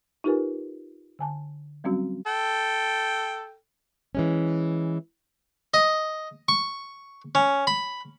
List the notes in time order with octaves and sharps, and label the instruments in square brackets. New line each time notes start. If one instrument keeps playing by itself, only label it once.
[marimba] D#4 F4 G4 A#4 B4 G#5
D3 G#5 A5
F#3 G3 C4 C#4 F#4
[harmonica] A4 G5
[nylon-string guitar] E3 G#3 C#4
[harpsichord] D#5
C#6
C#4
B5